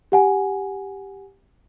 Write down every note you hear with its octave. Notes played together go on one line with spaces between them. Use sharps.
G4 F#5 G#5